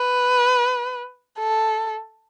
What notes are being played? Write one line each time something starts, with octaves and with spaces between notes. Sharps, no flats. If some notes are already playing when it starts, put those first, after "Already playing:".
Already playing: B4
A4